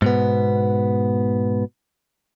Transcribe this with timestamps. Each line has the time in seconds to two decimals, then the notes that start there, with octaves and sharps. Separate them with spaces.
0.02 G#2 B2 B3